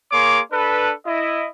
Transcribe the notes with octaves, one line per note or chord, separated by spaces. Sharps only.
A#3 G#4 C#5 C6 D6
D4 A4 B4
E4 D#5